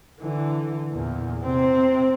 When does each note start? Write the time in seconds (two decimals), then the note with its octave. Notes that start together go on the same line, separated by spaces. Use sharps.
0.21 D3 E3
0.92 E2 A#2
1.43 C3 C4